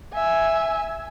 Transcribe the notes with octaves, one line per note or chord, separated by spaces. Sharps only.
E5 G#5